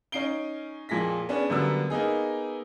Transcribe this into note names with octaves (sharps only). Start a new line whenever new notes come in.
C#4 D#4 C7 D7 G7
F2 A#2 G#4 A#6 B6
B3 C#4 D4 G#4
F#2 D3 G3 A#3 B3 E6
A#3 B3 D#4 G#4